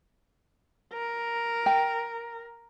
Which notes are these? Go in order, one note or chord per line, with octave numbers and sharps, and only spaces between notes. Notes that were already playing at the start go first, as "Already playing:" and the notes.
A#4
G5